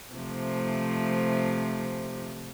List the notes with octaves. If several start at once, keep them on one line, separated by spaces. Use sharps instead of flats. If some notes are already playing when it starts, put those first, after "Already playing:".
C3 F3 A3